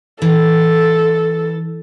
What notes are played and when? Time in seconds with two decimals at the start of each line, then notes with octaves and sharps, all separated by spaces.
0.22 E3 A4